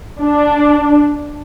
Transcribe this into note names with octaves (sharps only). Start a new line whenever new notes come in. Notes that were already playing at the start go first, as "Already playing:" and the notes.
D4